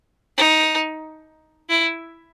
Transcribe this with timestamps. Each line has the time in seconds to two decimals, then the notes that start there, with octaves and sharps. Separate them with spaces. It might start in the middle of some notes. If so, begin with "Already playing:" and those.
0.37 D#4
1.69 E4